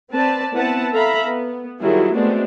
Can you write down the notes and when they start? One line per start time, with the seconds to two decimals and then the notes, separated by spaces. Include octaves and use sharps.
0.12 C4 B4 D5 A5
0.54 B3 C4 E4 B4 F#5 A5
0.93 A4 E5 F5 A#5 B5
1.25 B3
1.80 D#3 F#3 G3 E4 F4 G#4
2.14 G#3 A3 B3 C4 D4 F#4